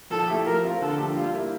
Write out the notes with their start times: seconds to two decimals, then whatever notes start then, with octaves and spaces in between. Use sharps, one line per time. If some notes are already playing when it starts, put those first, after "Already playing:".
0.11 F3 A4
0.28 A3 E4 G4
0.46 F3 A#4
0.63 C4 F4
0.81 D3 A4
0.98 F3 A3 D4 G4
1.15 G3 F4
1.34 A#3 E4